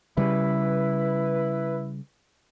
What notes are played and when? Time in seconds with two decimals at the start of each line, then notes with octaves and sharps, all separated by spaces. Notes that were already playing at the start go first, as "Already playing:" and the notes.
0.17 C#3 G3 E4 B4